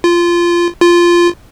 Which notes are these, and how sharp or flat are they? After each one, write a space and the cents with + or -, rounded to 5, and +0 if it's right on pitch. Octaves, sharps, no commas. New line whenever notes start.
F4 -15
F4 -10